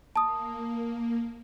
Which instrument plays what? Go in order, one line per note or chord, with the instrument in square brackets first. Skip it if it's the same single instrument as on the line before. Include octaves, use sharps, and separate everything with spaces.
[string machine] A#3 [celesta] A5 D#6